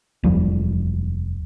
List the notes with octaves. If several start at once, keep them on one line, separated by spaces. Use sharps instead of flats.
F1 D#2 F3 G3